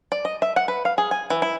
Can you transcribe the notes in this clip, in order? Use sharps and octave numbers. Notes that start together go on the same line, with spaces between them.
D5
D#5
E5
F#5
B4
F5
G#4
G#5
E3
E4